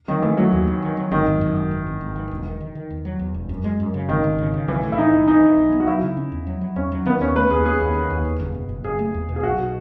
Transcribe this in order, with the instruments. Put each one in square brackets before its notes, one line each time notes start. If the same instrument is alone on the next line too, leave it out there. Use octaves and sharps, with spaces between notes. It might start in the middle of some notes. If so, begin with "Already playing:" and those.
[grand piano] D#3 [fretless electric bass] F#3
[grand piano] E3 [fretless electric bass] A3
[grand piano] F#3 [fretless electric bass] A3
[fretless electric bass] D#2
D#3
D#3
F#3
[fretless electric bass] G#1 [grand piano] D#3
[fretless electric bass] F#2
F#2
G#1
E3
G#1
G#1
E3
E1
D#3
D#3
D#3
E2
F#3
E2
E1
F#2
G#3
F#2
C#3
[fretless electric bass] G#1 [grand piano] D#3
[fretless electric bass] G#1
C#3
C#3
[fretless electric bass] B1 [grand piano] E3
[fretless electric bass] A2
[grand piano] E4
[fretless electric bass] E3 [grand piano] D#4
[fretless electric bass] B1
[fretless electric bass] E3 [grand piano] D#4
[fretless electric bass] E3
B1
B3
[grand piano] F#4
[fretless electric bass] F#3 [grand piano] E4
[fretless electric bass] C#3
C#4
E2
F#3
F#3
[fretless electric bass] E2 [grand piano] C#4
[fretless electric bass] F#3
[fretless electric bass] D#3 [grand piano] B3
[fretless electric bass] D#2 [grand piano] C#4
[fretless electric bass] A3 [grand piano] B4
[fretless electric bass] D#2 [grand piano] G#4
[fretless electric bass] C#4 [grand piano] G#4
[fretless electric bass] D#2
D#3
D#2
E2
F#1
B2
F#1
[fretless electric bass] F#1 [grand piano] G#4
[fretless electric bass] A3
E2
B2
[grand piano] G#4
[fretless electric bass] B1 [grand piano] F#4
[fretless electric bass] B2